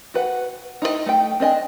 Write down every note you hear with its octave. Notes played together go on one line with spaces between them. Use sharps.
F#4 B4 F#5
D#4 E4 F#4 D#5
A3 G5
C4 D4 D#5 G#5